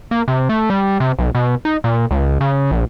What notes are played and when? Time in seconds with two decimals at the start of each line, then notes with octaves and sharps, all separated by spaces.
0.11 A#3
0.28 C3
0.49 A3
0.70 G3
1.00 C3
1.19 B1
1.35 B2
1.65 D#4
1.84 A#2
2.11 C#2
2.41 C#3
2.71 A#1